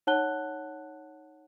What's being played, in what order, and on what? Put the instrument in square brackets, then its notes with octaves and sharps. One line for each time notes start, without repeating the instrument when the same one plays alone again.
[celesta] D#4 C#5 F#5 A5 F#6 G7